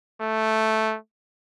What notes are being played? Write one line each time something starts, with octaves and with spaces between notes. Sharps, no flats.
A3